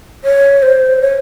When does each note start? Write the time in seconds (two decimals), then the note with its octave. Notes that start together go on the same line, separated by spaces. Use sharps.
0.24 C#5
0.62 C5
1.02 C#5